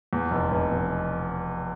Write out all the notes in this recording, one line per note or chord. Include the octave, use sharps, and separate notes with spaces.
E2
F1
F1
B2